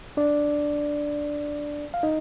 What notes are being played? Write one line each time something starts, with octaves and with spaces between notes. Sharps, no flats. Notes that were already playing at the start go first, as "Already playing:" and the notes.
D4 D5
F5
D#4 D#5